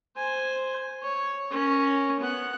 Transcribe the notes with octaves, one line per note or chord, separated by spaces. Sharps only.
C5 G#5
C#5
C#4 A#4
B3 F#5